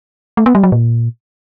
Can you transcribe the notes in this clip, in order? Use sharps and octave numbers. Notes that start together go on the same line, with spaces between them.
A3
B3
G3
F#3
A#2